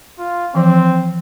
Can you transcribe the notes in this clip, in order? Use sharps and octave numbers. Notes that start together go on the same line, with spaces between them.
F4
E3 F3 C4